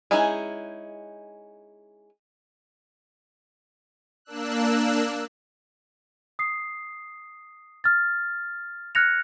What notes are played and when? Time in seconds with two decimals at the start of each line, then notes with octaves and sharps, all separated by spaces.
0.11 G#3 C#4 D#4 E4 G#4
4.25 A#3 D4 E6 F#6
6.39 D#6 C7
7.84 F6 A6
8.95 F6 F#6 G#6 A#6 C#7 F7